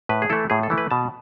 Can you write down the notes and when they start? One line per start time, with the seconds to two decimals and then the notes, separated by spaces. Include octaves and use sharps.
0.09 A2 B4
0.22 G#4
0.30 E3 A3 E4 A4
0.50 A2 G#4
0.63 A4
0.70 E3 A3 E4
0.78 B4
0.91 B2 A5